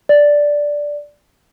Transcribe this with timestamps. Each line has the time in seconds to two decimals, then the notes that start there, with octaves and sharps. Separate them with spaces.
0.09 D5